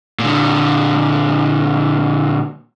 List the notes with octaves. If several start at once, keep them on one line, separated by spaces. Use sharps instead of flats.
A#2 D3